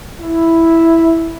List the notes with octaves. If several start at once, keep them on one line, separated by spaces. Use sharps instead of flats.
E4